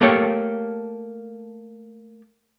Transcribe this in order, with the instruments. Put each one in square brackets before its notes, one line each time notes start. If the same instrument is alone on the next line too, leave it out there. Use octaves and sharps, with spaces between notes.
[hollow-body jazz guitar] A3 A#3 G4 A4 C#5